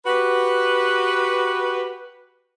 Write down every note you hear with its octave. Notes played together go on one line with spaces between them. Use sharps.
F#4 G4 B4